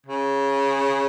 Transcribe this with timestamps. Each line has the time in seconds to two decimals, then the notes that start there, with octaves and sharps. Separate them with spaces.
0.06 C#3